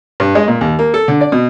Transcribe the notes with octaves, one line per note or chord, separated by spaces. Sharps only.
G2
G#3
A#2
D#2
A#3
A4
D3
D5
B2